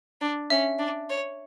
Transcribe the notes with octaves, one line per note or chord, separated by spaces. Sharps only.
D4
C#4 E5
D4
C#5